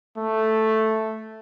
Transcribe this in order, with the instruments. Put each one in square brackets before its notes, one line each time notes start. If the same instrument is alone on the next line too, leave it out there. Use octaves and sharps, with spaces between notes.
[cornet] A3